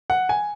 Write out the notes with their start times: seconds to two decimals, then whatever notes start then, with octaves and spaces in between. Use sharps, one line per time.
0.10 F#5
0.29 G#5